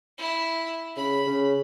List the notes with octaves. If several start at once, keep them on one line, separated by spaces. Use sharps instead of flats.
E4
C#3 B5
C#3